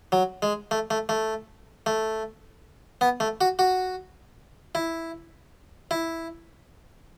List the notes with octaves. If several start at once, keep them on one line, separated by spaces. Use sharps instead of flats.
F#3
G#3
A3
A3
A3
A3
B3
A3
F#4
F#4
E4
E4